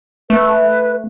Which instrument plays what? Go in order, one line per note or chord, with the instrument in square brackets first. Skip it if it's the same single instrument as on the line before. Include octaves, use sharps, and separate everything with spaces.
[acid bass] A3 [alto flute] B4